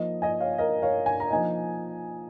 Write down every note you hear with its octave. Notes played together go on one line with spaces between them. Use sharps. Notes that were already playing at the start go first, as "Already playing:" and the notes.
Already playing: F3 A#3 D#4 D#5
D#5 G#5
C#5 F5
A#4 D#5
C#5 F5
G#5
A#5
F3 A#3 D#4 D#5 G#5